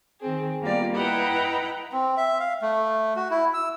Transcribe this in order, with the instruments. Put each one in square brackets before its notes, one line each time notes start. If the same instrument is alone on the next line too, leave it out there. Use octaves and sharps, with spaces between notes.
[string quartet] D#3 C4 G#4
G3 A#3 B3 F4 G4 D5
E4 B4 D#5 F#5 G5 A#5
[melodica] C4
E5
F5
A3
F#4
E4
E6